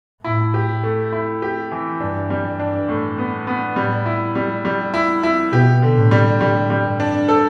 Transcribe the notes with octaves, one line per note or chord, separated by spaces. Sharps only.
A2 E4
G4
A3
E4
G4
E3
G2 D4
G3
G2
D4
A2
B3
B3
A2 G3
E4
G3
G3
E4
E4
B2 G4
D3
A2
G3
A2 G3
G3
G2
D4
A4